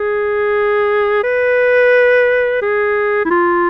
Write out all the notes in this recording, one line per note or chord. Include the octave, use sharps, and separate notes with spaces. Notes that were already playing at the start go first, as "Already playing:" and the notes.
Already playing: G#4
B4
G#4
E4
F4